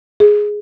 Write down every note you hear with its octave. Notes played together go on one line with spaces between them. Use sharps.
G#4